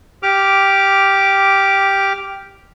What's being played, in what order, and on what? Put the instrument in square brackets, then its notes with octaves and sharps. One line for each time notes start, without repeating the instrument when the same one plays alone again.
[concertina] G4 D6 F6